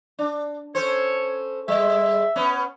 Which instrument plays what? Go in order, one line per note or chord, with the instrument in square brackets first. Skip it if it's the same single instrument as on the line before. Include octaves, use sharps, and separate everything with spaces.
[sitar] D4
[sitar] C#4 A4 C5 [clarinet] C#5
[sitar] G3 G#3 [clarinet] E5
[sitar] B3 C#4